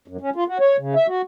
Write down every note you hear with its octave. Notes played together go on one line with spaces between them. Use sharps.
F#2
C#4
F4
F#4
C#5
C#3
E5
F#4